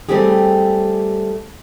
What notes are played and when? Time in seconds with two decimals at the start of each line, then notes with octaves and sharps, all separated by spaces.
0.09 G3 A3 C4 C#4 G4 G#4